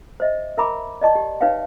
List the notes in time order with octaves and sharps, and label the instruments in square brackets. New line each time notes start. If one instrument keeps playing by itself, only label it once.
[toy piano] C5 D#5 E5
A#4 E5 G#5 A#5 B5 D6
D5 D#5 A5 C#6
G4
D#4 B4 C#5 E5 F5 G5